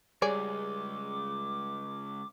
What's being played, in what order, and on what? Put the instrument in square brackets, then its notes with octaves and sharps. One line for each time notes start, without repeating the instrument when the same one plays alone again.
[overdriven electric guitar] C#2 [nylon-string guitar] G3 G#4 [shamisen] C#5 D5 G#5 [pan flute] D6